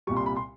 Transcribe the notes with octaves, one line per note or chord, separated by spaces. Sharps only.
C2 A#2 G3 C#6
C6
B5
C6